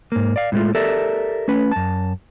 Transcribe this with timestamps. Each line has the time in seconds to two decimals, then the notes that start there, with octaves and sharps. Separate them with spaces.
0.12 G#2 A#3
0.36 D5 F5
0.52 A2 G#3 A3 F4
0.75 G4 A4 A#4 D5 E5
1.48 A3 C#4 B4
1.72 F#2 A5